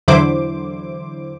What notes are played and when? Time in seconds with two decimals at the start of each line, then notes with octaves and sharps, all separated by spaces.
0.08 E2 D3 F#3 E4 C5 D6